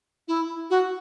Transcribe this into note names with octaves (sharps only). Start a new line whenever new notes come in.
E4
F#4